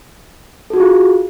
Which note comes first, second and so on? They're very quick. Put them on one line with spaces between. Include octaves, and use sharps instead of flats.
A4 F#4 G#4 F4